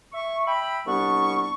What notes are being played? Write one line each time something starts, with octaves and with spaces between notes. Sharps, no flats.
E5 C#6
E5 G5 B5
C2 G3 B3 D4 C#6